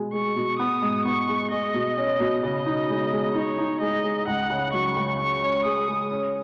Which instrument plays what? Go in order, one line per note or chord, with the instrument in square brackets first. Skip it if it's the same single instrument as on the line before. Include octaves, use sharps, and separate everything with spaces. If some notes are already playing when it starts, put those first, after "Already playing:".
Already playing: [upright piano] B2 G#3
[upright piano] G#3 [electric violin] C#6
[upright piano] B2
[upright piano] B3 [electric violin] D#6
[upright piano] G#2
[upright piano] B3 [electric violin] C#6
[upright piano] G#3
[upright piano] G#3 [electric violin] D#5
[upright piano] B2
C#4
B2
[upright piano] C#3 [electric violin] D#5
[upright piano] D#4
G#3
G#3
[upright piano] D#4 [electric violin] C#5
[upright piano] D#4
[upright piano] G#3 [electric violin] D#5
[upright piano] G#3
[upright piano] C#2 [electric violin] F#5
[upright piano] C#3
[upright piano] F#3 [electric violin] C#6
[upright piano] C#2
[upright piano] C#4 [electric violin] C#6
[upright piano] C#4
[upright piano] G#3 [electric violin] D#6
[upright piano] G#3
C#4